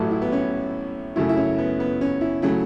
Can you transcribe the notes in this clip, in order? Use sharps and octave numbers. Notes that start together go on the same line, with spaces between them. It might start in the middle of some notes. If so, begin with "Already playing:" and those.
Already playing: A1 A2 F#3 A4
E4
B3
C#4
F#2 C#3 A3 E4
E4
C#4
B3
B3
C#4
E4
C#3 F#3 A3 E4